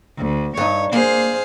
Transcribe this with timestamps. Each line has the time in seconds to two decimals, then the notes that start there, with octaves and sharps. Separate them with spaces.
0.16 D2
0.57 G2 D#4 C#5
0.93 A#3 G#4 C5 F5